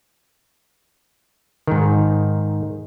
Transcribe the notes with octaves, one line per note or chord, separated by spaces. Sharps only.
G#2 D#3